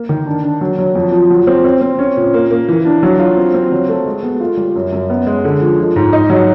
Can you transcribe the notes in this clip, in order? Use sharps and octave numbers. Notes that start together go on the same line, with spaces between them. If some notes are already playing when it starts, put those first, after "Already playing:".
Already playing: A#3
D#3
D4
D4
F#3
F#3
F2
F3
F#3
C4
C4
C4
C#4
A#2
A#3
A#3
E3
D4
F#3
F4
C4
C4
F#3
A3
G#3
B3
F4
G3
F#2
F#2
B3
G#3
D3
F3
F3
G#2
D#4
F#3